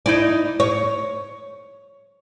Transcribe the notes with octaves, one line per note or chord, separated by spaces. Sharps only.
D#4 E4 D5
C#5